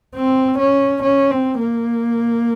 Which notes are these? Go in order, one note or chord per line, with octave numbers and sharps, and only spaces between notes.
C4
C#4
C#4
C4
A#3